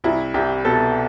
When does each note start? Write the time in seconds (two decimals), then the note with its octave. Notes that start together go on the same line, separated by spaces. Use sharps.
0.04 C2 E4
0.34 C2 G4
0.65 B2 A4